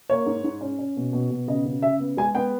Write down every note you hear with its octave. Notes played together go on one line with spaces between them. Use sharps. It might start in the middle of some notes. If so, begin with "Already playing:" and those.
A#3 C#5
G#2
G#2
C#4
C#4
B2
B2
B2
C#3 D#5
C#3
C#3 E5
B3
G#3 G#5
B3 G5